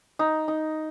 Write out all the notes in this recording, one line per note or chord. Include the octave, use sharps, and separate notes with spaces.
D#4
D#4